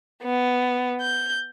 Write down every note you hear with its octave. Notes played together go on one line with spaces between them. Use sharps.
B3
G6